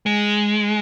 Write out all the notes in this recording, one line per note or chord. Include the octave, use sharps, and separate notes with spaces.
G#3